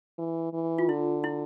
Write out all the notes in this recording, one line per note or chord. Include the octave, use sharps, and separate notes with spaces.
E3
E3
F4
D3 E4
E4